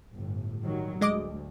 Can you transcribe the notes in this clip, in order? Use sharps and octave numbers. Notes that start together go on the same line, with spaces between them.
G1 A2
D#3 F#3 G3
D2 G#3 D#5 D6